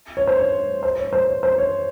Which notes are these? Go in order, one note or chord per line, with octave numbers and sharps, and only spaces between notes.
C#5
C5
C#5
C5
C#5
C5
C#5
C5
C#5